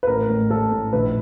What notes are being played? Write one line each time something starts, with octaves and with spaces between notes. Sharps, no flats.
B4
A1 A#4
A2
A2 A4
A2
A#1 B4